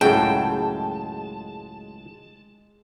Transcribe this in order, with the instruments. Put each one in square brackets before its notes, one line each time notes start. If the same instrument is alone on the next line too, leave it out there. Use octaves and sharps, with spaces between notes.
[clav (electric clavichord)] C#2 F#2 A2 [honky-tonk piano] G#3 [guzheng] G5 [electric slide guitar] A5